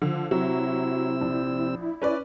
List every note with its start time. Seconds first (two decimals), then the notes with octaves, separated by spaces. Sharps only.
0.02 D3 F3
0.31 C3 F#3 C4 E4 E6
1.21 A#1
2.02 C#4 B4 D5